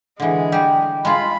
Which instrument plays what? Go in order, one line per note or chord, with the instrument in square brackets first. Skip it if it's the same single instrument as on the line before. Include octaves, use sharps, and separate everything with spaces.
[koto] D3 E3 [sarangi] G#3
[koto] G3 G4
[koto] G#3 F4 [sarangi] B5